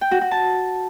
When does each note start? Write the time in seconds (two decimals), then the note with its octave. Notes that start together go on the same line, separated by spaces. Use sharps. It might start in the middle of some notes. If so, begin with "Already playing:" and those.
0.01 G5
0.11 F#4
0.21 F#4
0.31 A5